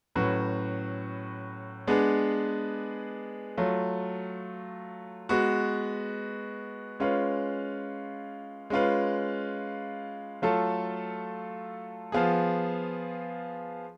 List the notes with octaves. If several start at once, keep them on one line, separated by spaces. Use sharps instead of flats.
A2 F#3 C#4 F#4 B4
G#3 B3 D4 G#4 B4
F#3 A3 F4
G#3 B3 F#4 B4
G#3 C#4 F4 B4
G#3 C#4 F4 B4
F#3 A3 F4 A4
F3 B3 F4 G#4